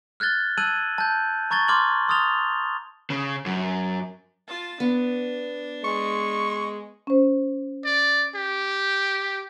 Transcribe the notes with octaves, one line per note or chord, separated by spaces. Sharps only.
F6 F#6 G#6 A6 G7
A5 E6 F#6 G#6 D#7 F#7
A5 G6
A#5 C#6 G#6 A6 G7
C6 D6 F6 G#6 F#7
C6 D#6 F6 A6 F7 G7
C#3
F#2
F4 A5
B3 D4
G#3 C#6
C#4 C5
D5
G4